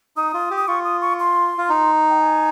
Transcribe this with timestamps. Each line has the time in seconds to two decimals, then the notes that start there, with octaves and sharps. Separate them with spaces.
0.16 D#4 D#6
0.34 F4
0.50 G4
0.57 D#6
0.68 F4 C#6
0.85 D#6
1.01 C#6
1.19 C6
1.58 F4
1.69 D#4
2.10 G5
2.21 G#5